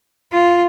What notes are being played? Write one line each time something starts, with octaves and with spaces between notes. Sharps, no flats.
F4